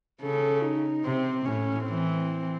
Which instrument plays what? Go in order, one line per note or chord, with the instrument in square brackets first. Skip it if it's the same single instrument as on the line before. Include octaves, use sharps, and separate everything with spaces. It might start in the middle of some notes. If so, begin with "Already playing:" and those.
[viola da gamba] C#3 [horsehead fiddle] A4
[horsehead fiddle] D#4
[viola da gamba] C3 [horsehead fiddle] C4
[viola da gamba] A2 [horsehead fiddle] C#4
[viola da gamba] E3 [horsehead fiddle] C4